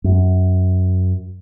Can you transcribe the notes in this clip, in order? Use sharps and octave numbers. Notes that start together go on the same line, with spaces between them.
F#2